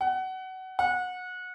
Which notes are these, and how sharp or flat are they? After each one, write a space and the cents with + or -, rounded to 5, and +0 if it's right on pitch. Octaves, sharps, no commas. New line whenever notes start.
F#5 +25
F#5 -25